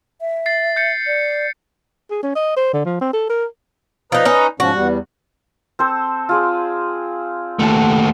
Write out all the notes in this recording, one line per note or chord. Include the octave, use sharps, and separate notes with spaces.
E5
A6 C7
G6 A6 C#7
D5
G#4
C#4
D#5
C5
D3
F3
C4
A4
A#4
F3 D#4 B4 D#5 A#5
C#4 D#4
G#2 F3 C#4 F#4
E2 G3
C4 A4 C5
F4 G#4 D5
D#2 A3 F#5 A5